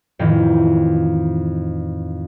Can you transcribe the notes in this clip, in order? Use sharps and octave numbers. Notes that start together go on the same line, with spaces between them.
F2 A2 D#3 E3